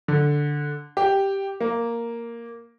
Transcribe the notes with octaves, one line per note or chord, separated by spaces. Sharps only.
D3
G4
A#3